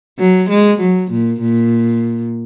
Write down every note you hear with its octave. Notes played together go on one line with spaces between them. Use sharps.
F#3
G#3
F#3
A#2
A#2